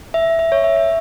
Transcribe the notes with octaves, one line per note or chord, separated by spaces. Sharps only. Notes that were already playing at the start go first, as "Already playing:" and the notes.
E5
E5
C#5
E5
E5